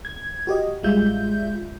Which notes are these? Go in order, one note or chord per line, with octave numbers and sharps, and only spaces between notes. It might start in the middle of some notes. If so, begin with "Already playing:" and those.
G#6
F#4 G4 D#5
A1 G3 G#3 F4 E5 G6